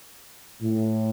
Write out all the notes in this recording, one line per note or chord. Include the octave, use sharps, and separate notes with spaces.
A2